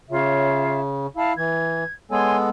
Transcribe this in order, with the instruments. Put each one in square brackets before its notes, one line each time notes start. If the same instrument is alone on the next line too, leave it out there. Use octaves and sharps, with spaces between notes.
[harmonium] C#3 [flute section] F4 C#5 E5
[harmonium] E4 [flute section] F5 A5
[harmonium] E3 [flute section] G#6
[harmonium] G#3 B3 A4 [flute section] C#5 G#5 C6